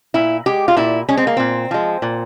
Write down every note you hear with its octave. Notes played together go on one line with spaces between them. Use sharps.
A#2 E4
G#3 G4
F4
A#2 E4
G#3 C#4
C4
A#3
A#2 C4
F3 G#3
A#2